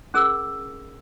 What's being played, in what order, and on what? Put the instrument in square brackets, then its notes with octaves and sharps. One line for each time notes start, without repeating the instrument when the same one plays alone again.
[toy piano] C#4 G#4 A#4 E6